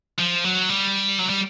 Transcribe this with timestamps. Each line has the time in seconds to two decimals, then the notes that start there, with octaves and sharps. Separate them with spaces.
0.19 F3
0.45 F#3
0.69 G3
1.20 F#3
1.30 G3